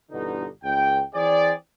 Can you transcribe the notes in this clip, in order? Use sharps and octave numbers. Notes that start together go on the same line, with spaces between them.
G1 B2 D3 E3 D#4
C#2 G5
E3 C4 G#4 D5